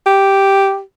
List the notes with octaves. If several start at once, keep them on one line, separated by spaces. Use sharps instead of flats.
G4